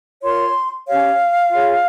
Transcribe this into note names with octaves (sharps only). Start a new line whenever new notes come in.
F4 A#4 C#5 C6
C#4 G4 C#5 F5
F4 G#4 C#5